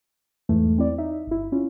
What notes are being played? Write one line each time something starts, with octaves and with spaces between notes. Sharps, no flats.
E2 G#2 E3 A3
C4 E4 D5
D#4 E5
G1 E4
C#4 E4 F4